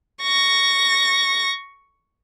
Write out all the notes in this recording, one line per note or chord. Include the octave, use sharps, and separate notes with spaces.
C#6 A#6